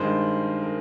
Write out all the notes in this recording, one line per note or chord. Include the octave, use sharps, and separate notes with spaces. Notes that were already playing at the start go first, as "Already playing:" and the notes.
Already playing: G2 D#3 G#3 C5
A#4